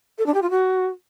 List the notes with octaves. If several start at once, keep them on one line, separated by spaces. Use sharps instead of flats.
A4
D4
G4
F4
F#4